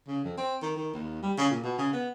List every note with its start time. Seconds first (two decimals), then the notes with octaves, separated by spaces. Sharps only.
0.08 C#3
0.25 F2
0.38 C4
0.62 D#3
0.76 D#3
0.94 D#2
1.23 G3
1.38 C#3
1.50 A#2
1.63 B2
1.78 C#3
1.93 B3